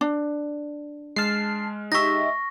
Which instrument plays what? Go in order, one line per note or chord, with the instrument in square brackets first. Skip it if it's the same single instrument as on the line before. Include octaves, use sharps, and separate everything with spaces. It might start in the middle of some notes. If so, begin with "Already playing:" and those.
[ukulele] D4
[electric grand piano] G#3 F6 [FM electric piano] A5 C7
[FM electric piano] D#4 G4 E5 [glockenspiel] C#6 A#6